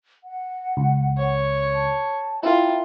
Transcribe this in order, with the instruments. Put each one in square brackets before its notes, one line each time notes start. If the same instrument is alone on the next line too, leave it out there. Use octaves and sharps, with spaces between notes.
[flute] F#5
[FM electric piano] C#2
[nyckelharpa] C#5
[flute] A5
[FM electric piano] E4 A#4 [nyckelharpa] F4 [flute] G5